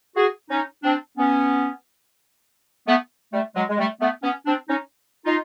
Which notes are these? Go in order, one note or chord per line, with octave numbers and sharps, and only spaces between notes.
F#4 G#4
C#4 D#4
C4 D4
B3 C#4
A3 B3
G3 A3
F#3 G#3
G#3
G3 A3
A3 B3
B3 C#4
C4 D4
C#4 D#4
D#4 F4